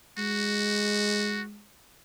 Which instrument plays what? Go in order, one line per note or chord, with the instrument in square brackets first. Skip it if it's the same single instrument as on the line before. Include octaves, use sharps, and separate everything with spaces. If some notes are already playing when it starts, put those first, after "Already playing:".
[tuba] G#3 [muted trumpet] F#4